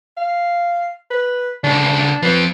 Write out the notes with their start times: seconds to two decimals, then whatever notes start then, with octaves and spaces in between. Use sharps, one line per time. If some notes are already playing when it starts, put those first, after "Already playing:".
0.17 F5
1.10 B4
1.64 D2 C#3 D4
2.22 F3 C4 B4